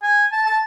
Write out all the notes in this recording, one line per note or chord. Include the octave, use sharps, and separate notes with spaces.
G#5
A5
A5